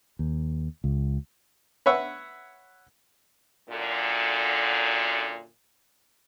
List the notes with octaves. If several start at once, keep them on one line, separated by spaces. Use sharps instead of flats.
D#2
C#2
B4 C#5 E5 F#5
F#2 A#2 D3